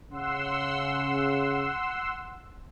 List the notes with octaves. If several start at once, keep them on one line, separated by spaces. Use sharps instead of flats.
C#3 F#5 C6 E6